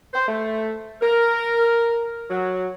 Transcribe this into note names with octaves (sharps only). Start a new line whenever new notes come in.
C5
A3
A#4
F#3